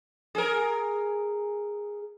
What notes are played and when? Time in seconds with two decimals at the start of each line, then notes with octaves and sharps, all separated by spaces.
0.35 G#4 A#4